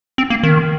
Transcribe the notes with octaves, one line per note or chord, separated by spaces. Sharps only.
C4
A#3
D#3